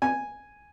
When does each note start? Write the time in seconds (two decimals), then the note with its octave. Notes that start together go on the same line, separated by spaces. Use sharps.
0.02 G#5